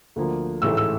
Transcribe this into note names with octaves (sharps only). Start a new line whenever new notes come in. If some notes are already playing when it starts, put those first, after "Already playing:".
D2 D3 F3 A#3
A1 G#2 E3 A3 E6
E6